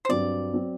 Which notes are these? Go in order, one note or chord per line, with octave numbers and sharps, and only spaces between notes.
C5
G2 F#3 C4 D5
F#3 C4